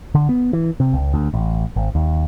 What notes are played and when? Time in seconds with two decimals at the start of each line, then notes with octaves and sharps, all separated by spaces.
0.15 D3
0.29 B3
0.53 E3
0.80 C3
0.94 C#2
1.14 D2
1.34 A1
1.76 G#1
1.95 D#2